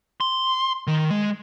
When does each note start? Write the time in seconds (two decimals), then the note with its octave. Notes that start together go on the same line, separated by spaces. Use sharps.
0.21 C6
0.87 D#3
1.11 G#3